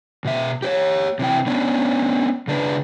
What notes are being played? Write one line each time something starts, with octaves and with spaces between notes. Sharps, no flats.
B2 E5
G4 C5 C#5
C3 E3 G5
B3 C#4 D4
C#3 D4 B4